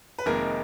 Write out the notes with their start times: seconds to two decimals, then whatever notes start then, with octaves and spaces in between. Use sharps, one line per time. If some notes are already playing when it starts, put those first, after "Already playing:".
0.19 B4
0.26 F1 F2 D#3 G#3 A#3 A#4